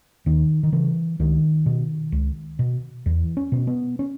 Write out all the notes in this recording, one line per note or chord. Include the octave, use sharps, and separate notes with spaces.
D#2 D#3
D#3
C#3 E3
C#2 D#3
B2
C#2
B2
E2 E3
C#4
B2
B3
C#4